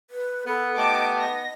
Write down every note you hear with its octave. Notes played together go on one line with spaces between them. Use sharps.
B4
B3 A4 B4
A3 D#4 G4 D#5 A5 D6
D#5 A#6